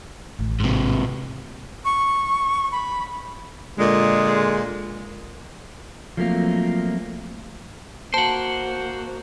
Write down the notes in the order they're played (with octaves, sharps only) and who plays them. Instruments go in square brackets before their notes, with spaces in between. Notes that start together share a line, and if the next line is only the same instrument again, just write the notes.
[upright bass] A1 D#3
[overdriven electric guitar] G#2 C3
[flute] C#6
B5
[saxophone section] A#2 D3 G#3
[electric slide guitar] F3 F#3 A3 A#3 C4 F4
[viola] A#3 F#4 [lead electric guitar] C5 F#5 [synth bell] A5